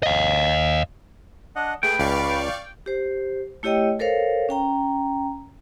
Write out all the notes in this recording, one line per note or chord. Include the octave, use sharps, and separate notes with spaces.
D#5 F5
D4 D#5 F#5
A3 G#4 B4 G5 B5
C#2 D5 F5 C#6
G4 C5
A3 E4 G4 C#5 D#5 G5
A4 A#4 C5 C#5 F5
C#4 G5 A#5